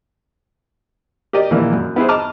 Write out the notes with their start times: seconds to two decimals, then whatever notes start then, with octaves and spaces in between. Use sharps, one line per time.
1.33 G4 A#4 D5 D#5
1.51 A#1 E3 A#3 D5
1.72 F#2
1.96 B3 E4 G#4 C5
2.09 D#5 A5 A#5 D6 F6